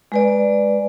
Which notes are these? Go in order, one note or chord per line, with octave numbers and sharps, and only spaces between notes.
G#3 B4 D5